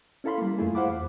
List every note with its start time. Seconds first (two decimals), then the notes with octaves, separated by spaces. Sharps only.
0.24 C#4 E4 A4 F5 B5 C6
0.38 G3 A#3
0.58 F#2 A3 E4 F4 G#4
0.75 C5 F5 F#5 B5 D6
0.88 E2